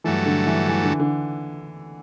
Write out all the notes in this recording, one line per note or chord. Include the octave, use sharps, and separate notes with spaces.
G2 E3 F#3 A3
D3
E3
E3
D3
D3